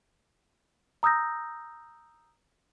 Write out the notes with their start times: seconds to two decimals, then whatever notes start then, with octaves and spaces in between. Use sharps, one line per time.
1.03 A#5 D#6 E6 G6 A#6